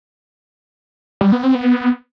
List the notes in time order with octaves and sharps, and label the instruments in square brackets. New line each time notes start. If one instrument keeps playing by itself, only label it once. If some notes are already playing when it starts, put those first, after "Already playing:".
[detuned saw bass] G3
B3
C4
B3